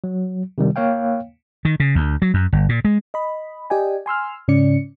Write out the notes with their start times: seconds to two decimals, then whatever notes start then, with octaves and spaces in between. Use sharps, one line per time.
0.04 F#3
0.58 C3 D#3 G3
0.76 A#3 C#5 F5 G5
1.65 D#3
1.80 C#3
1.95 D2
2.22 F#3
2.34 F#2
2.53 G1
2.69 A#2
2.85 G#3
3.14 D#5 B5
3.70 G4 D5 D#5 G5 G#5
4.06 G#5 C6 E6 F6
4.48 G#2 C#3 C#4 D5 C#7